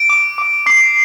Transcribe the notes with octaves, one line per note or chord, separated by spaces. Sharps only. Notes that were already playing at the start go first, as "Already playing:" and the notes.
Already playing: D7
D6
D6
D6 C7